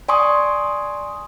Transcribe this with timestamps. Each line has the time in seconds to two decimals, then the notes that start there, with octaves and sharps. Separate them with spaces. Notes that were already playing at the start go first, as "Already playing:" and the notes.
0.08 D5 G#5 C6 C#6 D#6